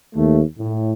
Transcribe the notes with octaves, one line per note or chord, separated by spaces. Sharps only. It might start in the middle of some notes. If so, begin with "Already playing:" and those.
D#2 A3
A2